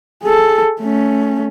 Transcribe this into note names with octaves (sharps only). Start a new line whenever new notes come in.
G#4 A4
A3 C#4